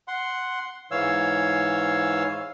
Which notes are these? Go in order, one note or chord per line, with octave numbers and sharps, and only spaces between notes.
F#5 C6
G#2 E3 C#5 F5 E6